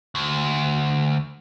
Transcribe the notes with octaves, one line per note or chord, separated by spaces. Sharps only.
D2